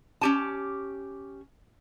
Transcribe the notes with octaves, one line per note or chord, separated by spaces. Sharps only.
C#4 G4 A5